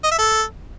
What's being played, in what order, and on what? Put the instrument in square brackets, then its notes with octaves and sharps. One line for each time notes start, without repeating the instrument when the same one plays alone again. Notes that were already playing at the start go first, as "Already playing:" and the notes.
[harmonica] D#5
E5
A4